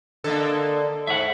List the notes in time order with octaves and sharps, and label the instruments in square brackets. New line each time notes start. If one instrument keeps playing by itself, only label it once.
[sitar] D3 A#3 [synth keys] A4 D#5
[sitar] G#2 [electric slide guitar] E5 F#5